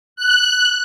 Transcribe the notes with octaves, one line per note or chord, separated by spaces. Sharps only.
F#6